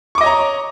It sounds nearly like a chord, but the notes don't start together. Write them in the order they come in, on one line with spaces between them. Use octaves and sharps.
C#6 D6 D#5 C#5 A#5